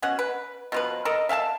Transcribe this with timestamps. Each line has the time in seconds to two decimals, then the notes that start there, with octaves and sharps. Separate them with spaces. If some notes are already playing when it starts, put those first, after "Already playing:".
0.02 B2 C#4 F#5
0.19 B4
0.72 B2 F3 B4
1.05 A4 A#4 D#5
1.29 E5 F5 G5 A5